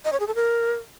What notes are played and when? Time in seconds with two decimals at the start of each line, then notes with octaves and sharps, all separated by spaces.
0.05 D#5
0.12 C#5
0.20 G#4
0.27 A4
0.35 A#4